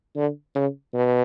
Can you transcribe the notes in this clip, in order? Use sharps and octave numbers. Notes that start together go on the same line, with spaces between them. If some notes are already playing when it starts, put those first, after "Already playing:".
D3
C#3
B2